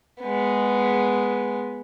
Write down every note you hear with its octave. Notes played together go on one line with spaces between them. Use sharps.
G#3 B3